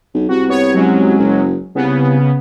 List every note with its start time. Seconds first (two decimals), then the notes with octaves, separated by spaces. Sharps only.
0.14 B1
0.29 C2 F#4
0.49 B3 C#5
0.74 F#3 G#3 C#4
1.18 F#1
1.75 C2 C#3 B3